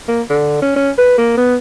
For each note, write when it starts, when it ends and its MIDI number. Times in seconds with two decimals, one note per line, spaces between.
0.08 0.22 58
0.29 0.59 50
0.62 0.73 61
0.76 0.90 61
0.98 1.16 71
1.17 1.32 58
1.37 1.55 59